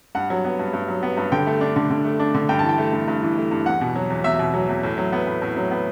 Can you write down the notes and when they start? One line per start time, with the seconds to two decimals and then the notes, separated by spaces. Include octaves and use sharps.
0.15 G2 F#5
0.30 F#3
0.45 B3
0.59 G2
0.73 G2
0.88 F#3
1.03 B3
1.17 G2
1.32 D3 G5
1.47 A3
1.61 D4
1.76 D3
1.90 D3
2.05 A3
2.19 D4
2.35 D3
2.49 G2 G5
2.59 E3 A5
2.69 G5
2.78 A3
2.93 G2
3.08 G2
3.23 E3
3.37 A3
3.51 G2
3.66 E2 F#5
3.81 B2
3.96 F#3
4.10 E2
4.24 E2 E5
4.39 B2
4.54 F#3
4.69 E2
4.83 A2
4.98 F#3
5.13 B3
5.27 A2
5.42 A2
5.57 F#3
5.71 B3